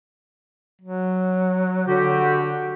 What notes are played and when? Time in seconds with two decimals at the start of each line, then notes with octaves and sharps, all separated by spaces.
0.81 F#3
1.87 D3 F#4 G4